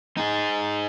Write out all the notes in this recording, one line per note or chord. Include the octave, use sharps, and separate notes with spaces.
D#4 G#4